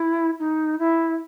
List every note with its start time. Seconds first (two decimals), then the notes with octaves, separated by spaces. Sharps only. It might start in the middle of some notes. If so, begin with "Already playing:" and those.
Already playing: E4
0.39 D#4
0.79 E4